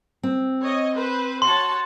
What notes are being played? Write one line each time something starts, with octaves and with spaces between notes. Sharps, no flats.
C4
C#5 D#5
B4 C5
F#4 C#5 A5 C6